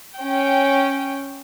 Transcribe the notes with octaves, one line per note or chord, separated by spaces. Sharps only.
C#4 G5